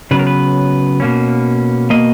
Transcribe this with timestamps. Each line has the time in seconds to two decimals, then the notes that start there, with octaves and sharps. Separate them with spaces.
0.11 C#3 F#3 B3 B4
0.19 A#4
0.27 B4
1.00 B2 A#3 C#4
1.90 B2 A#3 D#5